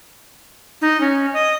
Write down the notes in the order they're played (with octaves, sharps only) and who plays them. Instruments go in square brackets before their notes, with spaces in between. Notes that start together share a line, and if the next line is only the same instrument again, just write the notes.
[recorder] D#4
C#4
D#5